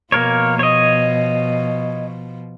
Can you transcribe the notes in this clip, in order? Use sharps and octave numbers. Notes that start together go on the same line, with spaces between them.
B2 F3 A#3 A#4 C#5
C#5 D#5